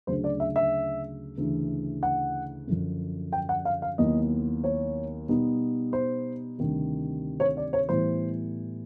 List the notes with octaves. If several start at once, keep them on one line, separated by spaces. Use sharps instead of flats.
D2 C#3 F#3 C5
D5
E5
E5
D2 C#3 E3
F#5
F#2 D3 F3
G5
F#5
F5
F5
D#2 D#3 F#3 B3 E4 D#5
C#5
B2 G3 B3 D#4
C5
D2 C3 D#3 G3
C#5
D5
C#5
A2 E3 G3 B3 E4 C5